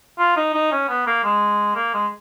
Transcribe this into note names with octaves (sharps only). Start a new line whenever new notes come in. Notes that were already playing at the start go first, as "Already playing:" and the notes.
F4
D#4
D#4
C#4
B3
A#3
G#3
A#3
G#3